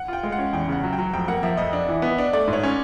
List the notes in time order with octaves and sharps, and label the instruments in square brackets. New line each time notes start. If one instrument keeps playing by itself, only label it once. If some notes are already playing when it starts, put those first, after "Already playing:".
Already playing: [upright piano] F#5
[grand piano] F4 [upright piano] G5
[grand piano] G#3
[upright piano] F#5
[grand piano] C#4
[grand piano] E2 [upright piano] G5
[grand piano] C#3 [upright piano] F#5
[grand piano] F#3
[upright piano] G5
[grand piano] F#3
[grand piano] F2 [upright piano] G5
[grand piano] A#3 [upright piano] F#5
[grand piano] F3 [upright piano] E5
[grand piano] F2 [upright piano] D#5
[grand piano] D4
E3
B3
D4
[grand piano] A3 [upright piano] D5
[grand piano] G#2
[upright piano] C#5
[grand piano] C#4